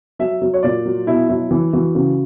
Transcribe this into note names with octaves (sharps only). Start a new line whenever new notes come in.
F#3 E5
F#3
C#5
A#2 D5
F#3
B2 E4
F#3 E4
E3
E3 F#4
C#3 F#4